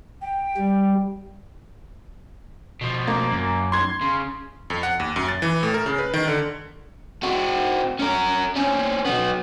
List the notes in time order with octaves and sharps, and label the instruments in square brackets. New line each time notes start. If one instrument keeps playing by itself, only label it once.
[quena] G5
[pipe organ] G3
[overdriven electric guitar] B2 F3
[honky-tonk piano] A#3
[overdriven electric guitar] F#2
[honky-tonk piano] C6 G#6
[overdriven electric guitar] C#3
[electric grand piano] F2
F#5
D#2
F#2
A6
E3
A2
A#4
C#3
B4
D#3
D3
[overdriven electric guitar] C4 F#4
C#4 A#4
C4 C#4
F#3 B3